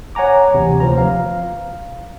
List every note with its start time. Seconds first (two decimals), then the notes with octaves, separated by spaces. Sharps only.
0.15 C#5 F#5 G#5 A#5 D6
0.53 D2 C3 E3
0.80 D2 F3 B4 A#5
0.98 F5